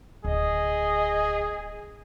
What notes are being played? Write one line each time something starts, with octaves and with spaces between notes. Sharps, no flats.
D1 G#4 D#5